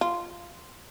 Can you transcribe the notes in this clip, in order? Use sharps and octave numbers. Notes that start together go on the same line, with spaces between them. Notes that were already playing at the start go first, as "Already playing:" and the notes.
F4